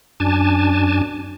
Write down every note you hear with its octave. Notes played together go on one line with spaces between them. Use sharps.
F#2 D4 G#5 A5